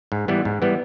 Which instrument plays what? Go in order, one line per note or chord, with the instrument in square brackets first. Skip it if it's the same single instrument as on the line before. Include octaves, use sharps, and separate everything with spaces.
[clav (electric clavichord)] G#2
E3 G3 B3
G#2
E3 G3 B3